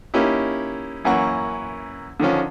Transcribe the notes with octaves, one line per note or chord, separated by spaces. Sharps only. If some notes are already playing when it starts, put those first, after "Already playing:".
A#3 C#4 D#4 E4 G4
F#2 E3 A#3 C#4 F#5 C#6
D3 D#3 F3 C#4